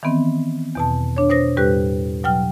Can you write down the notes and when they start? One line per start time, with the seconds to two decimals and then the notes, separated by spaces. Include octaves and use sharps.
0.03 D#3 E3 B3 C4
0.75 E2 B2 A5
1.17 D4 C#5
1.29 B2 C5 D#6 A#6
1.57 E2 A2 G3 G4 B4 F#6
2.24 B2 F#3 G5 F6